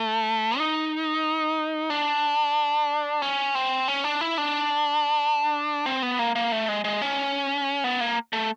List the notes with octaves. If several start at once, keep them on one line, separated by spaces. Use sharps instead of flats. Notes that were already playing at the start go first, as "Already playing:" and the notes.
Already playing: A3
D#4
D4
C#4
C4
C#4
D4
E4
D4
C4
B3
A#3
A#3
A3
G#3
G#3
C#4
B3
A#3
A3